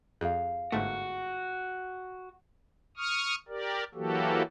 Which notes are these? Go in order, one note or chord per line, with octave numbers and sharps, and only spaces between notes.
F2 G#4 F5
G1 G#2 A3 F#4
C#6 D#6 F6
G4 A#4 D5
E3 F#3 A#3 F#4 G4 A4